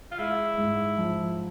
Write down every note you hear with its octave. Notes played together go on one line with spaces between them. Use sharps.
F4
G#3 E4
G#2
F3